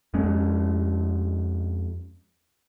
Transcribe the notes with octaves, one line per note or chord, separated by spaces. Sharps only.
F2 G#3 C#4